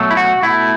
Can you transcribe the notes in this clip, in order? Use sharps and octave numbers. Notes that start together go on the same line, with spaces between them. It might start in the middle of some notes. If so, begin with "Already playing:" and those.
Already playing: B2 F#3 A3
E4
F#4
B2 A3 E4